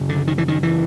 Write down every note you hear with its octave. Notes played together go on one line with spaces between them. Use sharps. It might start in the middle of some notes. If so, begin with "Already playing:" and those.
Already playing: F#2 C#3
D3
D#3
E3
D#3
E3